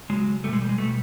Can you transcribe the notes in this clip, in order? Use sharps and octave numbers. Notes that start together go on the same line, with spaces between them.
C#3 F#3 G#3
G3 A3
B2
G#3
G3
G#3
B2 G3 A3